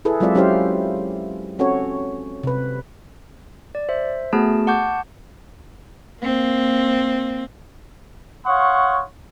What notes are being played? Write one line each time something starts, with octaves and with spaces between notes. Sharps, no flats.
E4 G#4 A4 B4
F#3 G#3 C4 F4 D5 E5
F#3 C#4 E4 G4 C5 F5
C4 C#4 F#4 A4 C#5
C3 B4
D5
C5 E5
A3 B3 F#4 G#4 A5
F#5 A5 C#6 D6 G6
A#3 C4
C#5 F5 F#5 C6 C#6 D#6